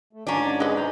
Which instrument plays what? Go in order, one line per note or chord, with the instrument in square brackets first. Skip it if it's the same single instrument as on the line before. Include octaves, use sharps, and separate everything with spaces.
[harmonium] A3
[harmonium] G#2 [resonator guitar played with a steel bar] C#4 D4 [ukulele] E5 G#5 A#5
[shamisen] G#3 B4 [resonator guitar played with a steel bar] D#5
[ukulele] C5 A#5 B5